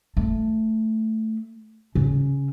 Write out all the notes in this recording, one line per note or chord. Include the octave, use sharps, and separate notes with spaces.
A3
C#3